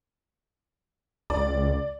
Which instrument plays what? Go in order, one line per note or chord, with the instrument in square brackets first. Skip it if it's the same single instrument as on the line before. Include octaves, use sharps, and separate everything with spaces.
[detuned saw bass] C#2 [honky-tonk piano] D5